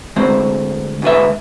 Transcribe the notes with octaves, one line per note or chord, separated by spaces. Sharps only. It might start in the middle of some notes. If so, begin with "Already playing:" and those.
D2 G#3 C4 C5
D2 G#2 B4 E5